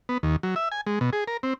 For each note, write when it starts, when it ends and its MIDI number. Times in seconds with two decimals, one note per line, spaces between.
0.09 0.18 59
0.23 0.36 39
0.43 0.55 54
0.56 0.69 76
0.72 0.81 80
0.87 0.99 56
1.01 1.10 47
1.13 1.24 68
1.27 1.37 70
1.43 1.54 60